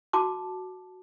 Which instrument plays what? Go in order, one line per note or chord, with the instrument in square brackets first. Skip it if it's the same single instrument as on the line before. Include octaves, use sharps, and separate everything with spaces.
[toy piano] F#4 A5 D6